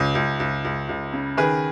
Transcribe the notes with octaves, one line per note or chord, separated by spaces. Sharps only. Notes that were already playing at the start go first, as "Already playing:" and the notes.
Already playing: C#2
C#2
C#2
C#2
C#2
C#3
D#3 G#4 B4